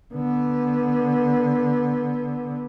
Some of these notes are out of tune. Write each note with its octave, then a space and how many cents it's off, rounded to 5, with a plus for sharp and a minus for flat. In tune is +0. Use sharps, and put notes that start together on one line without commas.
D3 +0 B3 -15